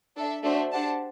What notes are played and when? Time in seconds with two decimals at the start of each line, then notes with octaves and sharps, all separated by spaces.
0.16 D4 A4 E5
0.43 A3 D4 F#4 C5 E5
0.71 D4 G4 C5 F#5 A5